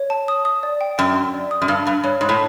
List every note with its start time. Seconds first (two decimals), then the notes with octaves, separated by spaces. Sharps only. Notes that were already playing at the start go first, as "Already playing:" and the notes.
Already playing: C#5
0.10 A5
0.28 D#6
0.45 D#6
0.63 D5
0.81 G5
0.98 F#2 G5
1.16 C6
1.34 D5
1.51 D#6
1.62 F#2
1.68 G2 B5
1.86 G2 B5
2.04 G2 C#5
2.21 G#2 B5
2.29 A2